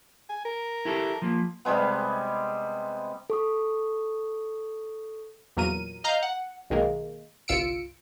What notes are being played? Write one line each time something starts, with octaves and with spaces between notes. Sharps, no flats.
G#5
A#4
E4 G4 A4
F3 A#3
C3 G3 G#3 B3
A4 C#6 D#6
E2 A#2 F#3 A#4 D#7
D#5 F5 A#5 G6
F#5
B1 D#3 G#3 A#3
G1 C2 F4 E6 C#7 D7